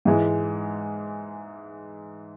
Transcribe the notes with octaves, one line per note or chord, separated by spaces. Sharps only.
G#2 E3 G#3